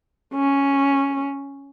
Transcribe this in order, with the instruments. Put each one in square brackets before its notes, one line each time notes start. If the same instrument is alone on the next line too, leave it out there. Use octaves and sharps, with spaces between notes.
[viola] C#4